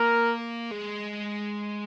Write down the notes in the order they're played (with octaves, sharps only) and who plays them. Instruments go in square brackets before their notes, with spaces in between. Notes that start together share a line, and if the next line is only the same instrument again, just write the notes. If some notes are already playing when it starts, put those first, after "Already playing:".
Already playing: [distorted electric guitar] A#3 [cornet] A#4
[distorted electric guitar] G#3